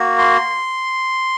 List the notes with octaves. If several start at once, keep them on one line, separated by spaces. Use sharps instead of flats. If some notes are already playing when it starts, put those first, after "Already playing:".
Already playing: A#3 F#4
C6